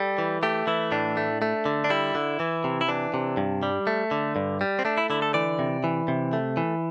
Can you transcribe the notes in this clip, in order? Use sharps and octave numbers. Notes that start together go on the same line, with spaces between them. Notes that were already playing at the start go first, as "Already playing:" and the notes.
Already playing: G3 A4
E3
A3 G4
E3 E4
A2 D4
A3
A3
D3
D4
G3 E4
D3
E3
C3
E4
E3 D4
C3
G2
G3
A3
D3
G2
G3
C4
A3 D4
E4
D3 E4
A4
E3 D5
C3
E3
C3
A3
E3